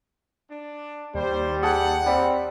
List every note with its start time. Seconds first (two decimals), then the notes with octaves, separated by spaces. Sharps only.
0.49 D4
1.15 D#2 G3 C5
1.63 G#4 F#5 G5 A5
2.06 G3 C4